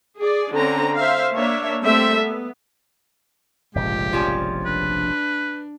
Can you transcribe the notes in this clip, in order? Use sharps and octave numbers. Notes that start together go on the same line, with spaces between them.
G#4 D5
D3 C4 C#4 A#5
C5 E5 F5
A#3 D4 C#5 E5
G3 A3 A#3 C4 A4 E5
B3
F1 A#1 G#2 C#3 F4 G4
F3 G3 C#4
D4 B4